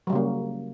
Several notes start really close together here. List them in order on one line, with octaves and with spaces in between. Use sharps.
F#3 G3 C#3 A#3